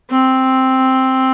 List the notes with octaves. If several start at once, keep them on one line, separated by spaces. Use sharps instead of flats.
C4